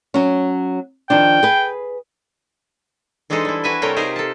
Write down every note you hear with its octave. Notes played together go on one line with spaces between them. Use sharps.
F#3 C#4
D#3 F3 D4 G5
G#4 B4
E3 G#3 D4 D#4 A4 C5
G3 E4
F#4 B4 E5 G#5
C3 G3 A3 A#4 C#5 G5
D#4 F4 G4 G#4 A#4 C5
A4 A5